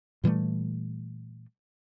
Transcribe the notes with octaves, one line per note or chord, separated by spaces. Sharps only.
A#2 E3 G3 A3